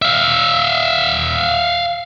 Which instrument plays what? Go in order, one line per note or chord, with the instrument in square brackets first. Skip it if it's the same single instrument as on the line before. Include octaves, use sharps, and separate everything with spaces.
[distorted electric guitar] E5 F5